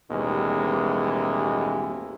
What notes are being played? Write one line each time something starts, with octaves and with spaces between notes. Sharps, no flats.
A1 D#2 B2 E3 G3 G#3